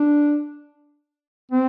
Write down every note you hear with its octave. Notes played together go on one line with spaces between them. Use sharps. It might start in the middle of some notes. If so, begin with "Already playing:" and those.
Already playing: D4
C4